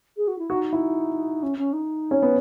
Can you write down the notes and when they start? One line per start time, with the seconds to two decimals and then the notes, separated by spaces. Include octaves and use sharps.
0.17 G#4
0.28 F#4
0.39 E4
0.49 D#4 F#4
0.73 E4
1.43 C#4
1.58 C#4
1.73 D#4
2.11 C#4
2.22 B3